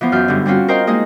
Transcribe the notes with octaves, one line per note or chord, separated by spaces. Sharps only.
E3 F3 B3 C5
F#2 F6 G6
G2 D3
G3 C4 C#4 F4 F#4
A#4 C5 D#5 F5 G5
G#3 A#3 D#4 G#4 D#5